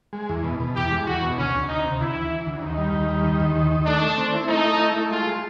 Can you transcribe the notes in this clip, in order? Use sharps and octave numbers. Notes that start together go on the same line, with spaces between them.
G#3
E2
B2
B2
E2 G4
G#3
E2 F#4
B2
D2 C#4
D2
D2 D#4
C3
D2 E4
E3
E3
D2
D#2 D#4
G3
D#2
G3
D#3
D#2
D#3
D#3
A3 D4
A3
C4
E4
A3 D#4
A3
E4
A3
G#3 F4
G#3